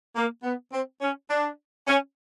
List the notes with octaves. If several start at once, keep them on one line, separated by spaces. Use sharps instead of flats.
A#3
B3
C4
C#4
D4
C#4